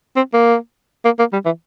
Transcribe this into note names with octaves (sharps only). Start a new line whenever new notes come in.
C4
A#3
A#3
A#3
G3
E3